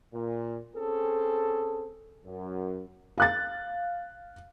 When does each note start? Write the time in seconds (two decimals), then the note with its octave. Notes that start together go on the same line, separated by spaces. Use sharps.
0.14 A#2
0.76 C4 C#4 G#4 A4
2.25 F#2
3.18 F5 F#6 A6